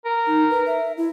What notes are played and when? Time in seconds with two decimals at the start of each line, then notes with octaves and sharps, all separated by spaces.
0.05 A#4
0.27 D#4
0.50 B4
0.67 E5
0.97 E4